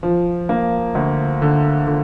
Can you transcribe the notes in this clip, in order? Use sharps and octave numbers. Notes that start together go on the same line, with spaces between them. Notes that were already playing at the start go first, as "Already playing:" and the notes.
F3
A#3
D2
D3
D3